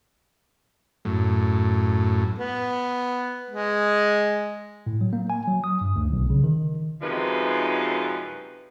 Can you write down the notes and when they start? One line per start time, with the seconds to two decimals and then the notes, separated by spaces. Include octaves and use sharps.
1.05 F#2 A2
2.38 B3
3.50 G#3
4.86 A2
5.01 F#3
5.13 A#3
5.30 G#5
5.48 F#3
5.64 D#6
5.81 G2
5.96 D2
6.12 B1
6.30 C#3
6.44 D#3
7.02 F#2 C3 F3 G#3 D#4 B4